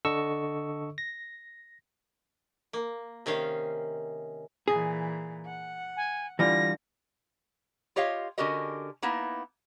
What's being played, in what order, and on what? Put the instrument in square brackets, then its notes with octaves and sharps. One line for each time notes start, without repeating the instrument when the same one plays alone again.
[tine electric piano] D3 A4 D#5 C#6 E6
A#6
[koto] A#3
C3 D#3 C#4 F5
[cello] A#2 E3 [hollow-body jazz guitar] G#4
[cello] F#5
[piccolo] G#5
[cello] D3 [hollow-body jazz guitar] E3 G3 F4 [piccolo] A#6
[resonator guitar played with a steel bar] F4 G4 C#5 D#5 F5
D3 C#4 F#4 G4 A#4 D#5
A#3 B3 D#4 E4